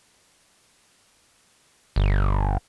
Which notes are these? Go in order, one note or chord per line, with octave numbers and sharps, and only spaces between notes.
G1